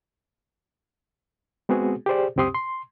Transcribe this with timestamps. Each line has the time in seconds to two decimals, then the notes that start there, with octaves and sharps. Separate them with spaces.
1.69 G#3 B3 C4 F#4 G#4
2.06 G4 G#4 C5 D5
2.36 C#2 F#2 C4 G4 C6 D#6
2.55 C6